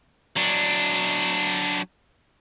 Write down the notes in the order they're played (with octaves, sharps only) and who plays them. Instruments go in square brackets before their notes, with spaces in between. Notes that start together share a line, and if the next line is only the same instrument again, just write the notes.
[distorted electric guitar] F#3 D4